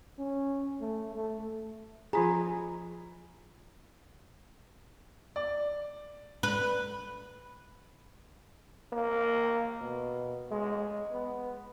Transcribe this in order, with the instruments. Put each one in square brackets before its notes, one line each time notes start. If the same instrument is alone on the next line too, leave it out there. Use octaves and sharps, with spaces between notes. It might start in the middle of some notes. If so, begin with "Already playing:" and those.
[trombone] C#4
A3
A3
[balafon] F3 F4 A#5 [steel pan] G#4
[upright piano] D5
[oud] B4
[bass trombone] A#3
B2
G#3
B3